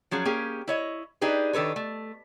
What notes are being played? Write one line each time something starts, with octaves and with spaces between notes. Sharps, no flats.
F3 F#3 C#4 G#4
A#3 C#4 G4 G#4
E4 C#5 D#5
D4 D#4 G4 G#4 B4
D#3 D4 A4 B4 C#5
A3